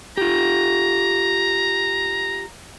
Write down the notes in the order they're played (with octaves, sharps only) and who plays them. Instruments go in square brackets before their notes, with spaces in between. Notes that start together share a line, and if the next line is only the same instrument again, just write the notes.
[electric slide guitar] F4 G4 [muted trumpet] A#5